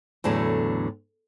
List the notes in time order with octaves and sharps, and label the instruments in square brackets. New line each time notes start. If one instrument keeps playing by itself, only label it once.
[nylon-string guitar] E2 A2 D3 F#3 A3